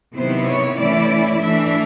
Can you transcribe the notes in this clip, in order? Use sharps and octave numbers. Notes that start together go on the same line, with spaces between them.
C3 D#3 F#3 B3 E4 C5
C#5
E3 A3 C#4 E4 D5
E3 A3 D4 E5